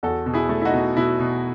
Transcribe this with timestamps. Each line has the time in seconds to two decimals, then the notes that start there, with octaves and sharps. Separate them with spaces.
0.03 E2 F#4 A4
0.26 B2
0.34 E4 G#4
0.49 A3
0.62 E4
0.65 D#4 F#4
0.73 B2
0.96 B2 E4
1.20 B2